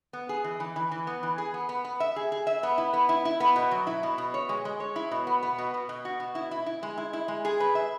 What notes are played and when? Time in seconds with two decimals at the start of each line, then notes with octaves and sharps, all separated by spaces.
0.13 B3
0.29 G#4
0.44 E3
0.60 E3
0.76 E3
0.91 E3
1.07 B3
1.23 E3
1.38 G#4
1.54 B3
1.69 B3
1.85 B3
2.00 E5
2.16 G#4
2.32 G#4
2.47 E5
2.63 B3
2.78 E4
2.93 B3
3.09 E4
3.25 E4
3.40 B3
3.56 B2
3.71 F#3
3.87 E4
4.03 B2
4.18 B2
4.34 C#5
4.49 G#3
4.65 G#3
4.80 C#5
4.96 E4
5.11 B2
5.27 B3
5.43 B3
5.58 B2
5.74 B2
5.89 B2
6.05 F#4
6.20 B2
6.35 E4
6.51 E4
6.66 E4
6.83 G#3
6.98 E4
7.13 E4
7.28 G#3
7.45 G#4
7.60 B4
7.75 E5